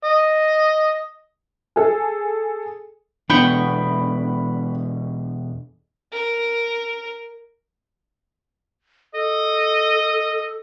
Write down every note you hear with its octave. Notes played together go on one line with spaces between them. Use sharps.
D#5
G#4 A4
E2 B2 D3 B3 D4 G5 B5 C#6
A#4
A4 D#5